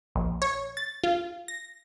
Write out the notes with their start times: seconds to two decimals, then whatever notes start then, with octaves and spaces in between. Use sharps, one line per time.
0.15 A#1
0.42 C#5
0.77 A6
1.04 F4
1.48 A#6